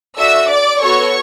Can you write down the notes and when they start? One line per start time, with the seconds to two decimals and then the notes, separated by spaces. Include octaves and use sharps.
0.18 D4 F#4 A4 E5 E6
0.49 D5 D6
0.81 B3 F#4 A4 C#5 C#6